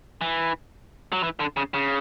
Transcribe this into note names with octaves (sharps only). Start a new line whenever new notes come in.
E3
F#3
E3
D3
C#3
C#3